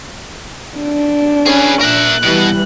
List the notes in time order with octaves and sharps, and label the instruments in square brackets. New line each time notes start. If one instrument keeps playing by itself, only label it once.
[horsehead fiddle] D4
[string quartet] C#4 [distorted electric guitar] G#4 B4
[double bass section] A#1 [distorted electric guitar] A#4 E5 [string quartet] F#6
[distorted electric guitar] B2 [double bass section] E3 G3